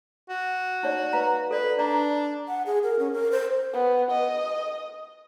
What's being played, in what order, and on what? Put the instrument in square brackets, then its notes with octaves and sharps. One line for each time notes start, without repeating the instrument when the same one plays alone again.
[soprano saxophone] F#4
[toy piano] D#4 C#5 D5
B4 F5 A#5
[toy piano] A4 D5 [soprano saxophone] B4
[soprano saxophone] D4 [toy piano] D5 A#5
[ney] F#5
G#4
A#4
C#4
A#4
C5
[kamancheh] B3
D#5